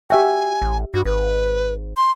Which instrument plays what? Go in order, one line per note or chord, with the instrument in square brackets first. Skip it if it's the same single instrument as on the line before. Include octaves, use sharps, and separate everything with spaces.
[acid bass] F#4 [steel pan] G4 E5 G5 [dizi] G#5
[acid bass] A1
[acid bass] G2 [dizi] F#4
[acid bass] G#1 [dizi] B4
[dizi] C6